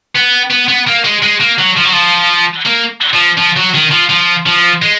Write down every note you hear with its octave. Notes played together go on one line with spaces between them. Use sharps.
B3
B3
B3
A#3
G#3
G#3
A#3
F#3
F3
F#3
F3
A#3
F3
F3
F#3
D#3
F3
F3
F3
G#3